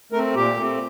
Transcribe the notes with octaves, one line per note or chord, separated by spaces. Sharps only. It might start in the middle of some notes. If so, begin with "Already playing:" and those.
A3 C4 A#4
A#2 G4
A3 C4